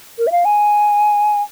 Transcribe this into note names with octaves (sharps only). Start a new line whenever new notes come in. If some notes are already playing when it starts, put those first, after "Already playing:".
A#4
E5
F5
G#5